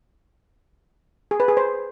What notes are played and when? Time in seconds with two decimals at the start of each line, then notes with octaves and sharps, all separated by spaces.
1.31 G#4
1.40 B4
1.48 G#4
1.57 C5